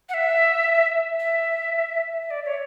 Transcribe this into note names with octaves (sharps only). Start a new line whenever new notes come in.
F#5
E5
E5
E5
D5
C#5